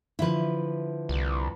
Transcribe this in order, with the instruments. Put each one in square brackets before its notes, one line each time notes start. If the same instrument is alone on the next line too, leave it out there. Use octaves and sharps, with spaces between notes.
[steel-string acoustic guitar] D3 F3 [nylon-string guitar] E4 B4
[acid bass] C2